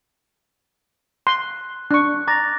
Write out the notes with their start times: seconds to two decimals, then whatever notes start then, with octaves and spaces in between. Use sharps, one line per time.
1.27 C6 F#6
1.91 D4 C#6 F#6
2.28 A#5 D6 A6 A#6